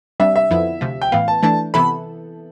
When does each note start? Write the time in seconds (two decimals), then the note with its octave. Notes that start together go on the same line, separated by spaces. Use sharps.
0.20 C3 G3 D4 E5
0.36 E5
0.50 F2 D3 F3 B3 E4
0.81 D2 C3 F3
1.02 G5
1.12 A2 E3 B3 F5
1.28 A5
1.42 E3 A3 D4 A5
1.74 C3 E3 B3 E4 A4 B5